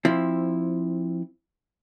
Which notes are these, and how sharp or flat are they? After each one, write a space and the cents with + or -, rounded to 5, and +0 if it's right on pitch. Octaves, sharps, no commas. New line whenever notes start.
F3 +0 C4 +15 E4 -5